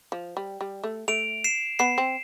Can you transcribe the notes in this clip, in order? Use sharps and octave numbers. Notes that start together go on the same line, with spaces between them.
F3
G3
G3
A3
A3 D7 F7
C7 E7
B3 C7 E7
C4